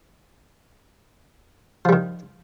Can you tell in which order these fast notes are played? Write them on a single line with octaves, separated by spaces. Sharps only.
F3 G3 D#3